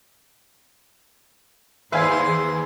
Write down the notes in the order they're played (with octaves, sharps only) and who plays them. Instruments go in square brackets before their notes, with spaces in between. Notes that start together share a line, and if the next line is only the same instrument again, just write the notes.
[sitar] D#2 B4 [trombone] G#2 [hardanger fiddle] C5 C6 [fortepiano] E5 F5 G#5
[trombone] G#4